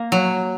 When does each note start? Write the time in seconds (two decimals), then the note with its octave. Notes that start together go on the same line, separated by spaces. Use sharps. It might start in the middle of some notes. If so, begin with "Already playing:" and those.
Already playing: A#3
0.12 F#3